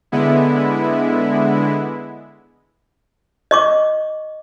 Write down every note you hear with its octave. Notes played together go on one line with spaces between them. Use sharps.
D3 G#3 B3 E4
D#5 C#6 D6